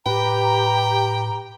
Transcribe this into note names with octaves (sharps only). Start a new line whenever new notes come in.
A2 G4 B4 G5 A#5